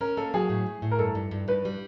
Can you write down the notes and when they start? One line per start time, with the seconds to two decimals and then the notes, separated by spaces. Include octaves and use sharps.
0.01 C#4 A#4
0.17 A#3 A4
0.34 F#3 G#4
0.49 A2
0.66 A2
0.82 A2
0.91 A#4
0.99 G2 A4
1.15 G2
1.31 G2
1.48 G2 B4
1.65 G3